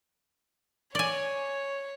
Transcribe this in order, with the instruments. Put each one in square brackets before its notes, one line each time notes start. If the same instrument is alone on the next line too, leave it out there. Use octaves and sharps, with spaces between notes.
[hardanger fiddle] C#5 [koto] D5 G#5